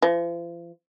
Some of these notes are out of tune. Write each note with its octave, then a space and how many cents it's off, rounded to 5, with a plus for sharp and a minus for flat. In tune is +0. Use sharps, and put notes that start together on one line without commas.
F3 -40